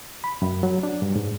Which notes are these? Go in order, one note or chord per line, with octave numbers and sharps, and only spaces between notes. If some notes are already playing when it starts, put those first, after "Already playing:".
B5
F#2
F#3
D4
G2
G#2